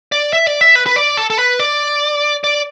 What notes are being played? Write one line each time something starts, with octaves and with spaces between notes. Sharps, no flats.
D5
E5
D5
E5
B4
B4
D5
A4
A4
B4
D5
D5